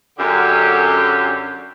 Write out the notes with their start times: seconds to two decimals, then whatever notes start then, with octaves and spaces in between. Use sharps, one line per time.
0.18 F#2 D3 G4